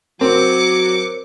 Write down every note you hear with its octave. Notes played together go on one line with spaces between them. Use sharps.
F#3 C4 A#4 C5 C#5 D6 C#7